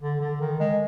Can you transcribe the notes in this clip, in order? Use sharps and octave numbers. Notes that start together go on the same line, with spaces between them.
D3
D3
D#3
G#3